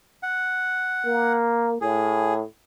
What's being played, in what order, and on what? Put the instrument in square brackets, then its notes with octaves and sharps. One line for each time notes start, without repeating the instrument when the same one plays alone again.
[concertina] F#5
[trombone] A#3
[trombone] A2 [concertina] G#4